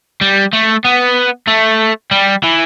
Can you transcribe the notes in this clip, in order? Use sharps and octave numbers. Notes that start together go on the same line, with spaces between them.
G3
A3
B3
A3
G3
E3